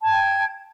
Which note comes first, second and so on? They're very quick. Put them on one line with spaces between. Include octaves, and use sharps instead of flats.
A5 G#6 G5